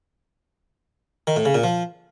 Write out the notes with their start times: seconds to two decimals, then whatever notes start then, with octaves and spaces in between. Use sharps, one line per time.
1.27 D#3
1.36 A2
1.45 C#3
1.55 A#2
1.64 F3